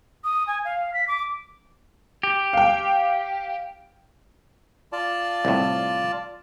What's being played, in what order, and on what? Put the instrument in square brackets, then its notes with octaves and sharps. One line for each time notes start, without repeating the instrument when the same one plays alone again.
[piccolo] D#6
G#5
F5
B6
D6
[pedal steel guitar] G4
[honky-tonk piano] F5 G5
[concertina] F4 D5 A5
[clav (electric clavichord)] C2 A2